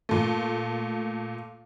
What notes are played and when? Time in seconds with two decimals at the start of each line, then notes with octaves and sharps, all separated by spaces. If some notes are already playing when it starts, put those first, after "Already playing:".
0.09 A#2 A3